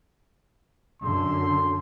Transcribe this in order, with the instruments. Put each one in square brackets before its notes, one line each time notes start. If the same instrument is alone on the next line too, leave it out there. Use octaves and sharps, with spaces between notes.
[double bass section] F#2 D3 [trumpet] C6